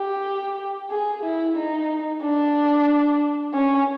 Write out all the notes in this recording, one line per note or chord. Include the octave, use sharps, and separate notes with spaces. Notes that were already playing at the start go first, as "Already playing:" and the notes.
Already playing: G4
G#4
E4
D#4
D4
C#4